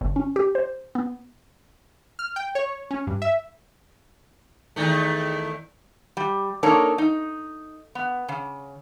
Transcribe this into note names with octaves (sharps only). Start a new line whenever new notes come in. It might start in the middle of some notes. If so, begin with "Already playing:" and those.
G1
C#4
G4
C5
B3
F6
G5
C#5
C#4
G2
E5
E2 D#3 A3
G3
A#3 D4 D#4 A4 A#4 C#5
D#4
B3
C#3